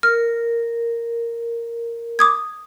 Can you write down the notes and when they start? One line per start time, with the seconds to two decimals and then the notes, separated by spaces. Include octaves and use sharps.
0.03 A#4 F6
2.19 D6 D#6 G#6